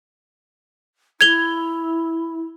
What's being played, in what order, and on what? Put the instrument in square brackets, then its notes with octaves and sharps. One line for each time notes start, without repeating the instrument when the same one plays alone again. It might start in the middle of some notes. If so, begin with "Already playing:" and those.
[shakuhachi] E4 [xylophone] G#6 F7 G7